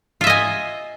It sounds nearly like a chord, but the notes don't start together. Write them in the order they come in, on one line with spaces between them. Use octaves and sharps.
F4 E5 D#5 G#5